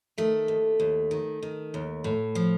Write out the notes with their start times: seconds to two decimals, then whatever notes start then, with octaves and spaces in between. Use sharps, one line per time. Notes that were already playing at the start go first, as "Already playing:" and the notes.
0.18 D#3 A3
0.48 D#2
0.80 D#2
1.11 D#3
1.43 D#3
1.74 D#2
2.04 A2
2.35 F3